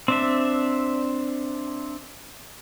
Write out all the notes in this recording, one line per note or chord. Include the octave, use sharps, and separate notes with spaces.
C4 D4 E5